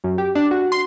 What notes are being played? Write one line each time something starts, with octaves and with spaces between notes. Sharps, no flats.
F#2
G4
D4
F#4
C6